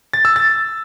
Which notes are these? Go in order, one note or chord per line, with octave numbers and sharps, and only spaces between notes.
A6
E6
A6